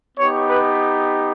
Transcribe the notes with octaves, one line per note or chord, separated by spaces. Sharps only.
B3 D#4 G4 C#5
B4